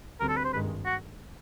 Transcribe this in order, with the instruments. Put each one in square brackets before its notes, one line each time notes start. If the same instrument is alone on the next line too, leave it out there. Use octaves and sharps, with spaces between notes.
[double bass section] D2 D3 G3 C4 [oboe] A#4
[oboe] A4
B4
C5
[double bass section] G#1 G2 D#3 G#3 [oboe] B4
[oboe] F#4